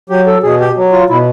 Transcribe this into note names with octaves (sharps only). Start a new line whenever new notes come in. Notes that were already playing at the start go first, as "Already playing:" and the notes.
F#3 G4
A4
B2 G#4
G4
F#3
F4
B2 E4